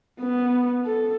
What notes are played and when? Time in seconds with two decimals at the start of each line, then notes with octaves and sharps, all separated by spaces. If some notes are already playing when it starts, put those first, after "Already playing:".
0.20 B3
0.86 A4